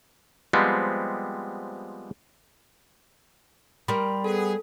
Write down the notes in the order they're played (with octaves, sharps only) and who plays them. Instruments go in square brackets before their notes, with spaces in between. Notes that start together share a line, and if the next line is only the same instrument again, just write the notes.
[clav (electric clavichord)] F3 G3 G#3 B3 C4
[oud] G3 A#4 [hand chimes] B5 C6
[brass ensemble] B3 G#4 [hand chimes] A4